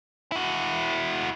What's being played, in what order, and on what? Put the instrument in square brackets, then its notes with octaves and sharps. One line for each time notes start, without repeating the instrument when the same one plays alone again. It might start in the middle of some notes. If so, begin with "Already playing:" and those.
[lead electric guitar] E4 F#4